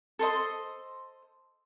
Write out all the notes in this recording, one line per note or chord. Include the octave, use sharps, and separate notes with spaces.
A4 C5 D#5 C6